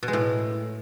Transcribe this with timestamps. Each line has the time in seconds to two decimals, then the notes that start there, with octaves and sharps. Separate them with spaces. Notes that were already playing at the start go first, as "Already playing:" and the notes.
0.03 B2
0.08 G#3
0.13 A2